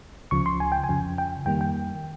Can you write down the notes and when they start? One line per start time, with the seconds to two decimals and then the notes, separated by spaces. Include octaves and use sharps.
0.31 C#2 C#3 F3 C#6
0.46 C6
0.60 G#5
0.72 G5
0.84 G#5
0.89 F2 C#3 F3
1.18 G5
1.46 F2 D#3 G3 A#3 G5
1.61 G5